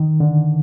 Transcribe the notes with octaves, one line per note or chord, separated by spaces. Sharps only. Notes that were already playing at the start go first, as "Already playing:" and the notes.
Already playing: D#3
D3